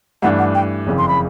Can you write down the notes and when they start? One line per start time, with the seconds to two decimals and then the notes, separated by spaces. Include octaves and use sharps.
0.22 G2 E3 A3 D4 F#5
0.39 F#5
0.55 G5
0.87 F#1 F2 C#3 E3
0.98 C6
1.08 B5